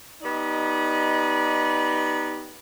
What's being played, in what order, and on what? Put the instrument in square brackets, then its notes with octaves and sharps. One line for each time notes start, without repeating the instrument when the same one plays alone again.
[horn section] B3 D#4 G4 D5 D#5